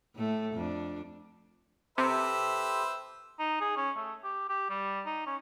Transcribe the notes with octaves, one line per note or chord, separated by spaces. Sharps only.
A2 A3
F2 D4
C3 G4 A4 B4 C5 E5
D#4
G#4
C#4
A3
G4
G4
G3
D#4
C#4